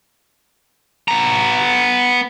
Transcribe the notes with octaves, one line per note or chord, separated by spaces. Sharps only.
B3 A#5